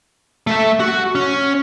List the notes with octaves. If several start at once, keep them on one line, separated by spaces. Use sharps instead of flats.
A3 E5
F#4
C#4